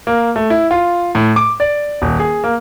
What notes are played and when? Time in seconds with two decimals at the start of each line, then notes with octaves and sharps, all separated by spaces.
0.07 A#3
0.36 A3
0.50 E4
0.71 F4
1.15 A2
1.36 D6
1.60 D5
2.02 D#1
2.19 G#4
2.44 A#3